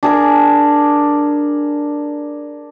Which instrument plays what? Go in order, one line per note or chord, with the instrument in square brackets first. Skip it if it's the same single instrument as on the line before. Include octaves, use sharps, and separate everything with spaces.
[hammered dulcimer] D4 G#4 A#4